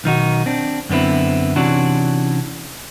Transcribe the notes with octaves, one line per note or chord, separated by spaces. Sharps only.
B1 D#3 D#4 F#4
C4 D4
F#2 D3 B3 C4 E4
C3 E3 C#4 D4 F#4